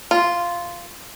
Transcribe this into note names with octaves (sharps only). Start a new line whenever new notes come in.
F4